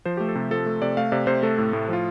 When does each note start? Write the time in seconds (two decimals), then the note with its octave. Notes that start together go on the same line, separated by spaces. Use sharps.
0.05 F3 C5
0.17 A3 G4
0.28 A4
0.35 C3
0.51 F3 A4
0.66 A3
0.82 C3 D5
0.97 A3 F5
1.12 C3 D5
1.27 C3 C5
1.43 A3 A4
1.58 A2
1.73 A2
1.89 F3 F4